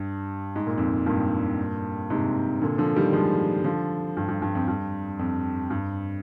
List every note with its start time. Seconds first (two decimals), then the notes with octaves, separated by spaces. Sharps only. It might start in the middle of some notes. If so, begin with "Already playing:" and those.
Already playing: G2
0.56 G#2
0.67 A#2
0.77 F2 G#2
1.06 G2 A#2
2.10 G#2 C3
2.61 A#2 D3
2.78 D3 F3
2.95 D#3 G3
3.13 F3 G#3
3.64 D3 F3
4.17 G2
4.28 G2
4.42 G2
4.55 F2
4.68 G2
5.19 F2
5.70 G2